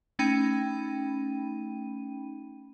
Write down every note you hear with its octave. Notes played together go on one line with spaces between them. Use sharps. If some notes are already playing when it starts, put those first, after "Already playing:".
A3 C#4 D#4 G5 B5 D#7